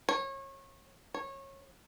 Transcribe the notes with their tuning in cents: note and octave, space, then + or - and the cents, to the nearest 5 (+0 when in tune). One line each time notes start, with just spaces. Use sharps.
C#5 -30
C#5 -25